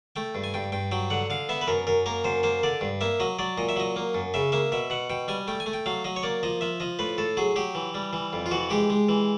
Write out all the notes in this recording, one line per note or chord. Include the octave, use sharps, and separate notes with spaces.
A3 G5
G2
G#5
G2 G5
G2 G5
F#3 G5
D3 F#5
D3 F5
B3 E5
B4
F#2 A#4
F#2 A#4
A#3 A#4
F#2 C5
A#3 C5
D3 D5
G2
A#3 E5
F#3 D#5
F#3 D5
A#2 D#5
E5
F#3 D#5
A#3
F#2
C#3 E5
A#3 E5
B2 E5
B2 F#5
B2 G5
G3 G#5
A3 G5
G#5
A3
G5
F#3 F5
F#3 D#5
C#5
A#3 D5
F3 D#5
F3 E5
F3 D#5
A2 B4
A2 A4
F#3 G#4
F#3 G4
E3
G3
E3
F2
F4
E3 F#4
G#3 G4
G#3
E3